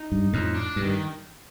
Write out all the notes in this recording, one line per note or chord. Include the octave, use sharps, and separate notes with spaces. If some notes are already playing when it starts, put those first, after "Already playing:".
Already playing: D#4
G2
F2 A2
D4
G2
D#3